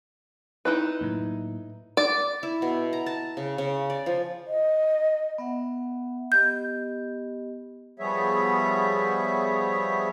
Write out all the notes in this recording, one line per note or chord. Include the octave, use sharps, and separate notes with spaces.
D#4 E4 B4
A2 F#3 A#3
D5
E4
B2
A#5
A5
C#3
C#3
D5
F3
D#5
B3 E5 F#5
B3 G4 D#5 G6
F3 G3 B3 G#4 C#5 E5